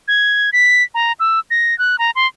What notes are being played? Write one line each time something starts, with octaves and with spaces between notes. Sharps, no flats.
G#6
B6
A#5
E6
A#6
F#6
A#5
C6